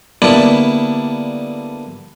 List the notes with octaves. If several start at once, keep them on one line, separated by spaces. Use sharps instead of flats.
D3 G3 A#3 B3 D4 E4